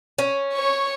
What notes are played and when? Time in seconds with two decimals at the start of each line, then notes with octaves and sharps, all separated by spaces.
0.18 C#4
0.54 C#5 C#6